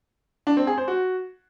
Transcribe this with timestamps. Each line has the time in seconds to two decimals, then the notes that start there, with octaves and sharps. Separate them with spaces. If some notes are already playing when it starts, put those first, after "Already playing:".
0.47 D4
0.57 C4
0.67 G#4
0.77 C5
0.88 F#4